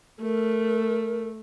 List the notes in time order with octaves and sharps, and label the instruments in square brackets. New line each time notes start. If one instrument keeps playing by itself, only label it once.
[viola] A3 [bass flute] A#4